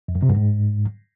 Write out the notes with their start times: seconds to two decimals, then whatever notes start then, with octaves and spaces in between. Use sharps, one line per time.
0.08 F2
0.15 F#2
0.22 C3
0.29 G2
0.36 G#2